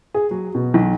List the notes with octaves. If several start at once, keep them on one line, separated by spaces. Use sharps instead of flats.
G#4
F#3
B2
B1